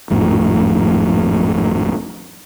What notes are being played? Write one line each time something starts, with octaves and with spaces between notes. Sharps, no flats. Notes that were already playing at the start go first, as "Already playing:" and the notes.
G#1 F2 A2 F3